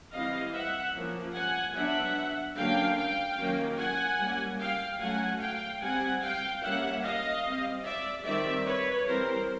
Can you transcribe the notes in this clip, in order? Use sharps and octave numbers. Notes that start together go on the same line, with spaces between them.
E3 G3 C4 D#5 F5
E5 F#5
F3 A#3 C#4
F#5 G#5
F#3 B3 D4 E5 F#5
D3 F#3 A#3 C#4 F5 G5
F5 G5
D#3 F#3 A#3 C#4
F#5 G#5
G3 A#3 C#4
F5 G5
F#3 A3 C#4 F#5 G#5
F5 G5
G3 C4 F#5 G#5
F5 G5
G3 A#3 C#4 E5 F#5
D#5 F5
G3 C4
D5 E5
D#3 G3 C4 D5 E5
B4 C#5
E3 G3 C4 A#4 C5